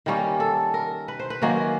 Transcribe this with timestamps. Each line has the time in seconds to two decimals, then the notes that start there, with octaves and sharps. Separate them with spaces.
0.06 D#3 G3 A#3 C#4
0.40 A4
0.74 A#4
1.08 B4
1.20 C5
1.30 B4
1.42 D#3 F#3 A#3 C#4